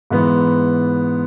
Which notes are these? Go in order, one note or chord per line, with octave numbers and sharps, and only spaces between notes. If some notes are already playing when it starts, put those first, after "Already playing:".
G#2 E3 B3